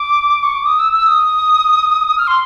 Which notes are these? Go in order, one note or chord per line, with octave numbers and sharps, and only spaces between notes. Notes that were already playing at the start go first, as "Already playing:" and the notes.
Already playing: D6
C#6
D6
D#6
E6
E6
D#6
F6
C6